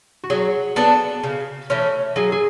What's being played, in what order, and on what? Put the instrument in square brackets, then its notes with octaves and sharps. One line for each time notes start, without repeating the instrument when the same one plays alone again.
[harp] F#4
[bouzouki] F#3 [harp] G#4
[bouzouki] B3 D4 A4
C#3
E3 A3 C#4
[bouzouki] F#3 [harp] G#4
[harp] G#4